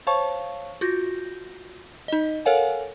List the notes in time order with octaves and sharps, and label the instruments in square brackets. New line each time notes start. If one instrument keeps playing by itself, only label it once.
[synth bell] C5 C#5 F5 A5 C#6
F4 F#4 G6 A#6
D#4 D#5
A4 A#4 C#5 F5 F#5 G#5